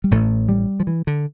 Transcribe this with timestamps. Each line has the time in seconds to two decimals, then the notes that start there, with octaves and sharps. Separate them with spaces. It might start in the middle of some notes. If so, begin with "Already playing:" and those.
0.04 G3
0.11 A1 A2 A3
0.49 G3
0.80 F3
0.87 E3
1.07 D3